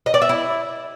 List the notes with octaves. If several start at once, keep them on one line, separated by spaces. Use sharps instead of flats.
D#5
D5
E5
E4